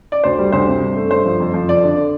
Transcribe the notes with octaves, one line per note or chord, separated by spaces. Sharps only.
D5
D2 C5
G3
D2 C5
C3
G2
A3
G2 C5
F3
F2
F3
F2 D5
D3